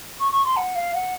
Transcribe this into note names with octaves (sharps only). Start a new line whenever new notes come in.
C#6
C#6
C6
F#5
F5
F#5